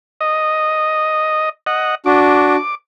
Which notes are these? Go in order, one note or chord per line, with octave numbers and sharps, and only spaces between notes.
D#5
D#5 F#5
D4 F#4 D6